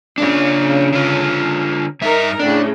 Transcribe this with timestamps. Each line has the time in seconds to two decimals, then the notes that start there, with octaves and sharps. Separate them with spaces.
0.18 C#3 D4 F4
0.93 D3 F4
2.02 G2 D#4 A#4 E5
2.39 A2 C#3 D4